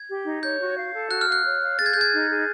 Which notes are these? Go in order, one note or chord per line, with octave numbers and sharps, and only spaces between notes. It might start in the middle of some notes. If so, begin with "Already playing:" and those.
Already playing: G#6
G4
D#4
C#5 G6
F#4
F5
A4
F#4 F#6
F6
F5
F#6
C#5
F5
G#4 A6
G#6
G#4 G6
G#6
D#4
G#4